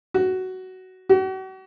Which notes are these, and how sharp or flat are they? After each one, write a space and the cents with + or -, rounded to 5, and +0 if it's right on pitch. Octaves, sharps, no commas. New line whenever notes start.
F#4 +10
F#4 +40